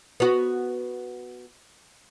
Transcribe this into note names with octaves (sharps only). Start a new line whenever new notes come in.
B3 F#4